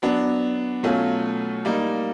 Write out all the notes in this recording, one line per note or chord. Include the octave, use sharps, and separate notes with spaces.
F#3 B3 D4
B2 F#3 A3 C#4 F4
G3 A#3 D#4